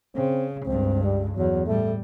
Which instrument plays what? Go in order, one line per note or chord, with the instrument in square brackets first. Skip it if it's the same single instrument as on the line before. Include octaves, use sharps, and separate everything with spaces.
[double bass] C#3 [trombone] C4
[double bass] C#2 G2 [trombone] C4
[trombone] G3
[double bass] E2 [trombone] F#3
[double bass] A2 G3 [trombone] A3